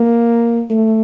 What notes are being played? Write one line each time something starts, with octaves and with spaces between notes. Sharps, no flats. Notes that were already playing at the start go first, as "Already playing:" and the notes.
Already playing: A#3
A3